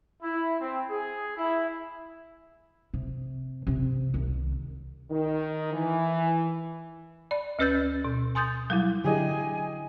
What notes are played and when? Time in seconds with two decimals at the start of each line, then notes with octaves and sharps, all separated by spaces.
0.23 E4
0.60 C4
0.90 G#4
1.36 E4
2.94 C3
3.67 C3 C4
4.14 C2 D#3
5.11 D#3
5.73 E3
7.31 D5 B5
7.59 D2 C#4 B4 E6 G6 A6
8.05 B2
8.35 G#5 C6 D#6 G6 A6
8.70 F#3 G3 E4
9.04 D3 F#3 E4 G4 G#4 D#5 G#5